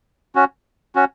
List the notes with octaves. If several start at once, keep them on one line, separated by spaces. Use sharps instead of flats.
C#4 F#4
C#4 F#4